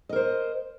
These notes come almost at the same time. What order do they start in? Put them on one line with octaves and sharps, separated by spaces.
D#5 A#4 C5